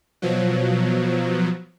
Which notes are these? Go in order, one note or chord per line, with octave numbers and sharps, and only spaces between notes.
B2 F3 F#3